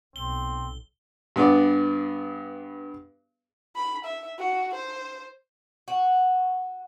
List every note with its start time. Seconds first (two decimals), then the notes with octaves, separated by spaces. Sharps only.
0.16 B1 C4 G7
1.36 G2 B3 G#4 D5
3.76 B5
4.05 E5
4.39 F#4
4.75 C5
5.88 F#4